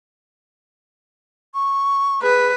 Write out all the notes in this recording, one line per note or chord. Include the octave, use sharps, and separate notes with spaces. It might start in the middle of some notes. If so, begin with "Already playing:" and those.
C#6
G#4 B4